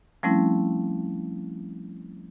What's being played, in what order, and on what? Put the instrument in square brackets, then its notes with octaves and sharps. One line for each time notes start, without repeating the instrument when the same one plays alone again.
[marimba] F3 G3 A3 C4 C#4 E4